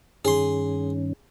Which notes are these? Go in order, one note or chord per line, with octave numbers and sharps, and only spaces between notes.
G2 D#3 C#4 G#4 C6